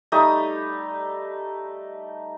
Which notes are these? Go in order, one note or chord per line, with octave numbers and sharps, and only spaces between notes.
G3 A3 D#4 D#6